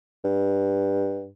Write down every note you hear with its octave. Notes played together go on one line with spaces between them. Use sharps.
G2